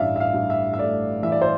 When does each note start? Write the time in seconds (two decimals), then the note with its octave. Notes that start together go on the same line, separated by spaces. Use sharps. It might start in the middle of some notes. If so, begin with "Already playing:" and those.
Already playing: A1 G2 E3 D5 E5 F5
0.16 E5
0.20 F5
0.34 G2
0.50 E5
0.73 E5
0.79 A3 D5
1.22 E3 E5
1.32 D5
1.42 C5